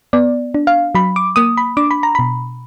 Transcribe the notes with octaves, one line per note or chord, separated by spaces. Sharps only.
B3 D5
D4
F5
F#3 B5
D6
A#3 D#6
B5
D4 D6
B5
A#5
B2 B5